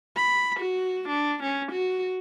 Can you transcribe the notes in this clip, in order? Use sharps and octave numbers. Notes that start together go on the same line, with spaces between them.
B5
F#4
D4
C#4
F#4